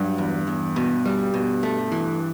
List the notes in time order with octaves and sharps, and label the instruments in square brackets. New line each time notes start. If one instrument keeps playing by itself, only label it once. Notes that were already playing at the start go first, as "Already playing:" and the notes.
Already playing: [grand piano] G2 [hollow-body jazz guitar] F#3
[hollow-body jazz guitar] E2
E2
B2
G3
B2
A3
E3